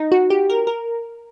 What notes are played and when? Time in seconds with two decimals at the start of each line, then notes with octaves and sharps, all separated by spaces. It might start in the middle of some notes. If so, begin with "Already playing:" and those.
Already playing: D#4
0.12 F#4
0.30 G4
0.50 A#4
0.67 A#4